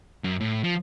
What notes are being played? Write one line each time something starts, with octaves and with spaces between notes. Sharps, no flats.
F#2
A2
F3